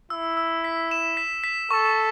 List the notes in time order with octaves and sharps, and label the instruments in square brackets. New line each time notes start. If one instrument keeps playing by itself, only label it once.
[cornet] E4 [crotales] E6
[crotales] E6
B6
E7
B6
B6
[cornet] A4 [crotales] C#6